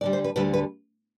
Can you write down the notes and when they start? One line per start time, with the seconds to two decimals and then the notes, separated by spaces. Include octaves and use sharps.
0.01 D2 D3 G3 D5
0.13 C5
0.24 B4
0.36 D2 D3 G3 B4
0.53 B4